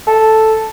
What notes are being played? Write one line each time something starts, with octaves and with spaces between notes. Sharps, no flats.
A4